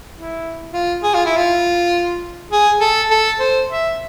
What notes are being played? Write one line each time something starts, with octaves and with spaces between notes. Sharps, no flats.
E4
F4
G#4
F4
E4
F4
G#4
A4
A4
C5
E5